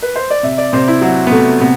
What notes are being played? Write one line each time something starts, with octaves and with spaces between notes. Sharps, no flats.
B4
C5
D5
C3 E5
D5
C3 C5
E4
F#3 F#4
B3
C3 A3
C3 B3